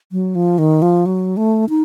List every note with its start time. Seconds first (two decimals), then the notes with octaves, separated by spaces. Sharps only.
0.12 F#3
0.35 F3
0.58 D#3
0.82 F3
1.06 F#3
1.37 A3
1.69 D#4